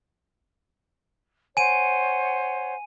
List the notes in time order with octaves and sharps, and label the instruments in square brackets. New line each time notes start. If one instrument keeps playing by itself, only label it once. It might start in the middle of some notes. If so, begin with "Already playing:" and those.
[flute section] C5 C#5 F#5 [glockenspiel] G#5 D#7